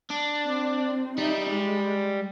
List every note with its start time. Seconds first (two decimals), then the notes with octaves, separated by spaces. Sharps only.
0.10 D4
0.46 C4
1.18 G3 D#4 E5
1.50 G#3